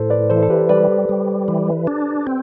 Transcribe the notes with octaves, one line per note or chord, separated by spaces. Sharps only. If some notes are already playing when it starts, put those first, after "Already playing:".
Already playing: A2 A4 C5
B4 D5
E3 A4 C5
A4
G4 B4
G3 B4 D5
G3
E3
D4
C4